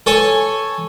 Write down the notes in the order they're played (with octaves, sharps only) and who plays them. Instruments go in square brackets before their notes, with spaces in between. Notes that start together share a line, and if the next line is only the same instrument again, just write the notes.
[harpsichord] A4 C#5 G#5